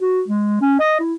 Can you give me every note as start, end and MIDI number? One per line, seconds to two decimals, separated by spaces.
0.01 0.22 66
0.28 0.57 56
0.61 0.75 61
0.80 0.99 75
1.00 1.14 64